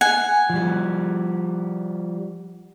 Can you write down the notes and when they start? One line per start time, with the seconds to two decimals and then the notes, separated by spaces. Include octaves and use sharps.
0.01 F#5 G#5
0.50 F3 G3